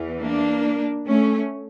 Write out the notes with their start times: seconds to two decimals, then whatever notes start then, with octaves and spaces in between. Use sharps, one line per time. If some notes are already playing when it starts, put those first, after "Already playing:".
Already playing: E2 E3
0.21 A#3 D4
1.06 A3 C#4